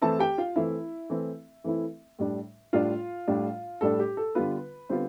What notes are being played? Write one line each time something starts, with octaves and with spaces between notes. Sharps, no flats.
E3 A3 C4 E4 A4 A5
G4 G5
F4 F5
E3 A3 C4 E4 E5
E3 A3 C4 E4
E3 A3 C4 E4
A2 G3 D4
A2 G3 D4 F4 F5
A2 G3 D4
A2 G3 D4 A4
G4
A4
D3 G3 B3 F4 B4
D3 G3 B3 C4 F4 C5